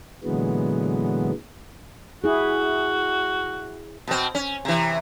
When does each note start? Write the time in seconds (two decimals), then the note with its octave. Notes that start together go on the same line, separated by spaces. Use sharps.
0.24 A#2 D3 E3 F#3 G#3 B3
2.24 E4 F#4 G#4
4.07 B2 C4
4.35 C#4
4.65 C3 E3